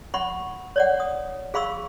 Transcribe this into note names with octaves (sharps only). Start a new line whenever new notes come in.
F#5 B5 C#6
C#5 D5 F#5
D#6
G#4 F5 B5 C#6 E6